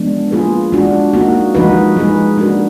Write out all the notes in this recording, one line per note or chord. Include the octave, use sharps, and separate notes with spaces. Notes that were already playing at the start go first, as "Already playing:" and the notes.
Already playing: F3 G#3 B3 D4
A#3 F4 G#4 B4
G#3 D4 F#4
A#3 D#4 F#4
F3 G#3 D#4 F#4 B4
G#3 D#4 G#4 B4
A#3 D4 F#4 A#4